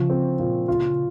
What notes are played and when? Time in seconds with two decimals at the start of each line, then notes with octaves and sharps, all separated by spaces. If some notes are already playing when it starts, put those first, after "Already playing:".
Already playing: C#3 F3
0.10 C4
0.39 A#2
0.68 F4